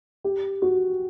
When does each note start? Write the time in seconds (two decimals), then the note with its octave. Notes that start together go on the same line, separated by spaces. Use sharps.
0.24 G4
0.62 F#4